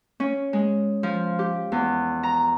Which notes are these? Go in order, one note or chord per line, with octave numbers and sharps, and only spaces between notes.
C#4
G#3
F3
G4
E2
A#5